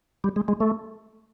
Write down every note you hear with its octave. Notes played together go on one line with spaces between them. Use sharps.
G3
G#3
G#3
A3